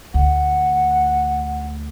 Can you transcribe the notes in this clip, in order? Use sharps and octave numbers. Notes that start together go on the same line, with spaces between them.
D2 F#5